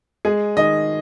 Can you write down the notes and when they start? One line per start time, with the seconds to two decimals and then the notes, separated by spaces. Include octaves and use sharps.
0.25 G#3 G#4
0.57 D#3 D#5